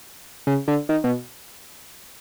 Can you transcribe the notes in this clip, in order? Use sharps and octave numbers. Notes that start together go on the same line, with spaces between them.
C#3
D3
D#3
B2